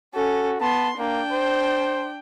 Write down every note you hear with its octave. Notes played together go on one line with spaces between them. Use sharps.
C#4 F#4 A4
B3 A5 C6
A#3 D4 G5
C5